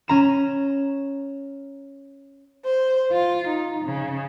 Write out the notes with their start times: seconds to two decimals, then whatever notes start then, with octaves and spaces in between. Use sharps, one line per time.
0.08 C#4 A#5 E7
2.65 C5
3.13 F4
3.49 D#4
3.85 C#3